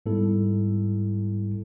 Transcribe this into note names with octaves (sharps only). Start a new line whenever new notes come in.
G#2 G3 B3 E4 A4